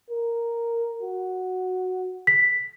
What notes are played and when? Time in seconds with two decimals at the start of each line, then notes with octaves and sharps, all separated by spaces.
0.10 A#4
1.03 F#4
2.27 B6